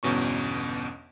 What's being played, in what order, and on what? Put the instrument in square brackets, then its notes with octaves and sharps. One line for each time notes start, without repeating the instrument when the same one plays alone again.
[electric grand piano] G1 E2 B2 C#4 C#6